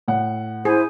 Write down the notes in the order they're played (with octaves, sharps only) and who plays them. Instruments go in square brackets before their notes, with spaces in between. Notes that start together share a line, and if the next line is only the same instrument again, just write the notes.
[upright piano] A2 F#5
[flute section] E4 [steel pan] G#4 [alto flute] C5